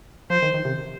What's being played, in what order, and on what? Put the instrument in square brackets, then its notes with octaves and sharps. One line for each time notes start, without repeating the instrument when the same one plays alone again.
[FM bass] F3 [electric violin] C5
[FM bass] D#3
D#3
C3